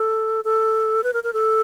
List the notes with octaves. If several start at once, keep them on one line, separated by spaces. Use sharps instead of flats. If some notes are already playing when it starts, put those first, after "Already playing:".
Already playing: A4
A4
B4
A#4
A#4
A4